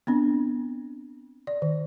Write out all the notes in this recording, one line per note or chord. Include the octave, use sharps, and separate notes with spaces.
B3 C4 D4
D5
D#3